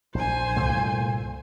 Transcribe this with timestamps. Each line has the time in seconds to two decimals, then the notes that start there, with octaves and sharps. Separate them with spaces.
0.15 A#1 C5 G#5
0.56 C2 G2 A#2 A3